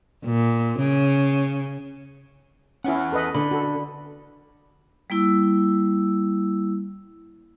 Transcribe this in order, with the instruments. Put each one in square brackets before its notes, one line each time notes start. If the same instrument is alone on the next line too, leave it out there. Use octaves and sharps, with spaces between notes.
[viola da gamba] A#2
C#3
[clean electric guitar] E2 B3 F#5 [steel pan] C#4 E4
[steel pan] A4 B4 D#5
[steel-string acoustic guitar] D3 [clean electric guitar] B5
[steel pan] F#4 A4
[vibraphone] G3 A#3 E4 E6